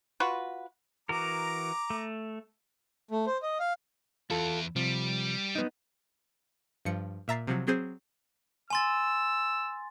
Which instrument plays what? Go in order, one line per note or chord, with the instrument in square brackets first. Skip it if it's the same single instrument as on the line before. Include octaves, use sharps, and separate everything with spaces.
[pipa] F4 F#4 B4
[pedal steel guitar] E3 F#4 A#4 [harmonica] A#5 D6
[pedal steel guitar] A3
[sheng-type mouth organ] A3
C5
D#5
F5
[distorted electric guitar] E2 E4 [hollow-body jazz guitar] F4 A4
[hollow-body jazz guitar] C3 F3 [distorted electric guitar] G3
[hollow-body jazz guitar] B3 D#4
[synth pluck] G2 F3 C#7
A#2 E5 A#5 A6 C7
C3 F3 F#3
F#3 C4 G#4 C5
[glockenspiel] G#5 C6 A6 [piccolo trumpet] E6